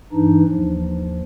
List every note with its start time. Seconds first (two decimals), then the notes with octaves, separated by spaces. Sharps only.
0.13 G2 E3 D4 D#4
0.49 D#2 F3